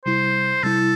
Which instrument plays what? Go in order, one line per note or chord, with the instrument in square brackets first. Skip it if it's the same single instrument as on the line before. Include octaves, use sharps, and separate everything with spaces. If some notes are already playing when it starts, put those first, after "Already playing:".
[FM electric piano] C3 G3 E4 [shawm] C5
[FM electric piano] C3 G3 E4 [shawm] A4